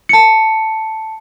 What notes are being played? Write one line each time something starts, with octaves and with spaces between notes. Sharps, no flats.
A5 C#7